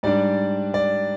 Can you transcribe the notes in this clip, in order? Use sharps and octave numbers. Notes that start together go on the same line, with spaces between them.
G#2 G3 D4 D5
D5